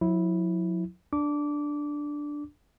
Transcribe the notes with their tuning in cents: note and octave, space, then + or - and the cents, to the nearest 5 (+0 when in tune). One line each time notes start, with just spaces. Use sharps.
F#3 -45 E4 -10
D4 +0 D6 -20